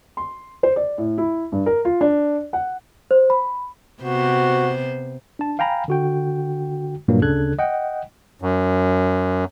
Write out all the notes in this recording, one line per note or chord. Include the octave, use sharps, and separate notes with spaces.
C6
C5
D5
A2
E4
G2
A#4
F4
D4
F#5
C5
B5
C3 B3 F#4 C5
D4 A5
F5 G5 G#5 A#5 B5
D3 F#4 G5
G2 A#2 F#3 A#3
D2 C#3 D4 A4 F#6 G#6
D#5 F#5 G5
F#2